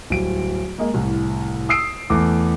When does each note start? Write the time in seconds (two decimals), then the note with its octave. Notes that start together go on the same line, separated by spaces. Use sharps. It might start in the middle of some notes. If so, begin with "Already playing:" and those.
0.10 D1 G3 D7
0.78 G#3 A#3
0.94 C2 A2
1.69 D#6 E6 C7 D7
2.10 E2 A3 D6